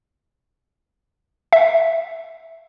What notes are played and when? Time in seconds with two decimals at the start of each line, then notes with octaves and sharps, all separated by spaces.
1.53 E5